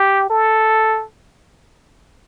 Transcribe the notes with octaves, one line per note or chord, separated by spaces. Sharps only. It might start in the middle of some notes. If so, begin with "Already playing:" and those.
Already playing: G4
A4